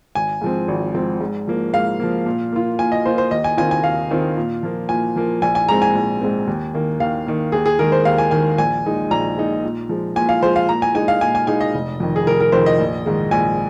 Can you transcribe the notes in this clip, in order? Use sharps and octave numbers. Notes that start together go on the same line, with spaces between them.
G#1 G#5
G#2 F3 C4
G#1
G#2 F3 C4
G#2
F3 A#3
G#2 F5
F3 A#3
A#2
A#3 F4
A#2 G#5
D#5
A#3 F4 C5
C5
D#2 D#5
G#5
D#3 C4 F4 G#5
G#5
D#2 F5
D#3 C4 F4
A#2
F3 A#3
A#2 G#5
F3 A#3
A#1 G#5
G#5
G#2 G#3 C4 A#5
G#5
A#1
G#2 G#3 C4
D#2
D#3 A#3
D#2 F5
D#3 A#3
D#2 G#4
G#4
D#3 G#3 A#4
C5
D#2 F5
G#5
D#3 G#3 G#5
A#1 G#5
A#2 G#3 D#4
A#1 A#5
A#2 G#3 D#4
A#2
F3 G#3
A#2 G#5
F5
F3 G#3 C5
F5
A#2 A#5
G#5
G#3 D#4 G#5
F5
A#2 G#5
G#5
G#3 D#4 G#5
D#5
F1
F2 D#3
G#4
F1 A#4
A#4
F2 D#3 C5
D#5
A#1
G#2 D#3 G#3
A#1 G#5